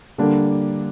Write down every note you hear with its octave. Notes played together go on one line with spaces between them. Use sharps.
D3 G3 A#3 D4